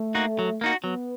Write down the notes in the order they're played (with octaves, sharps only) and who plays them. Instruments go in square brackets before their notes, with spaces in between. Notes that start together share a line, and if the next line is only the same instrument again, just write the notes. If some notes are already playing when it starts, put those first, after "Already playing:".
Already playing: [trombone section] A3
[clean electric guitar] A#3 D#4 F#4
F#3
A#3 D#4 F#4
[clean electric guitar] F#3 [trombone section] B3